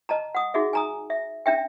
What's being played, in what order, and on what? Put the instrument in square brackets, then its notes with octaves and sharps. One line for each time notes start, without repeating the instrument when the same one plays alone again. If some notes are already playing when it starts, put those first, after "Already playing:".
[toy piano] D#5 A5 A#5
F#5 D#6
D#4 F#4 G#4 E5
G#5 A#5 D#6
E5
C#4 D4 E5 G5